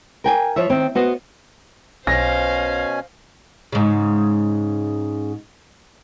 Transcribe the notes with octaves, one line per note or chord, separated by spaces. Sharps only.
A#4 G5 G#5
F3 C#5 E5
D#3 C4
B3 F#4 C5 D#5
B1 B2 C#4 C5 F5 G#5 A#6
G#2 C#3